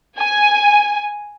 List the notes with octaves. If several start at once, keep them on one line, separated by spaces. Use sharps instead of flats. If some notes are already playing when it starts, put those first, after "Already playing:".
G#5